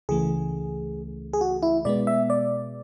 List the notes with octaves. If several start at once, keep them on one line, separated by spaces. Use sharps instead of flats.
C#2 C#3 E3 A3 G#4
G#4
F#4
E4
B2 G#3 B3 D5
E5
D5